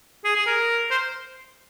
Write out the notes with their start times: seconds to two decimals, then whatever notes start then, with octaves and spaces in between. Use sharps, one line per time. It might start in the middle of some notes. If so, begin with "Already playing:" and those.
0.25 G#4
0.36 G#4
0.46 A#4
0.91 C5